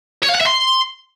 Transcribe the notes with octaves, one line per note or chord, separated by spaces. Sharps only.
C#5
F5
F#5
E5
C6